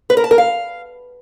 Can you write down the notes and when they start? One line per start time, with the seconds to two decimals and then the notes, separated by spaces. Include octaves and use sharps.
0.10 B4
0.17 A#4
0.24 A5
0.31 A#4
0.38 F5